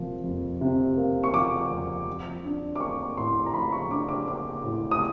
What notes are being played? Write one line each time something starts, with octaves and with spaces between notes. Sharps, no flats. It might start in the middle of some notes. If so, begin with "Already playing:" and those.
Already playing: C3 F3 A#3
F2
C3
A#3
C#6
F3 D6
F2
F3
D4
D6
A#3 C#6
A2 C6
A#5
F3 B5
C#6
D4 D6
D6
A#3 D6
A2
D#6